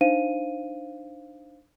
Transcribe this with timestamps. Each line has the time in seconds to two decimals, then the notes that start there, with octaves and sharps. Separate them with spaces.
0.01 D4 D#4 C5 F5 D#7